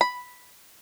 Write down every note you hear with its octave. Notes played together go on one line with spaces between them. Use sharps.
B5